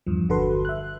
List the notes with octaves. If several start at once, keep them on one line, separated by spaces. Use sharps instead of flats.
E2 G2 F3
G1 D3 F#4 A4 B4 C6
E5 F#6